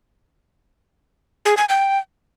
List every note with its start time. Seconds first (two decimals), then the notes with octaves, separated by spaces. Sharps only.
1.45 G#4
1.57 G#5
1.69 G5